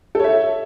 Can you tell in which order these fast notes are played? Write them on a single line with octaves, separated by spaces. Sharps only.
A4 C#5 E5